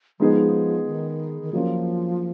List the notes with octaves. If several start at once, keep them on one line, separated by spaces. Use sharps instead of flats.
F3 G#3 B3 D#4 G#4
D#3
D#3
F3 F#3 A#3 C#4 F4